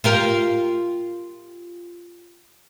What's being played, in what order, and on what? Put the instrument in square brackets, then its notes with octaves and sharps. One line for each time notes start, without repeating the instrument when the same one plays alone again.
[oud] F4 G4 A#4